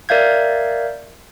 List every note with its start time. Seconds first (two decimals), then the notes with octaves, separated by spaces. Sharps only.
0.09 A#4 D5 E5 F5 G6 G#6